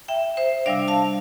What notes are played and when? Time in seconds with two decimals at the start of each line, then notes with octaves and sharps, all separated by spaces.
0.08 E5 G5
0.37 C5 E5
0.66 C3 G3 D4 D5 F5
0.88 F5 A5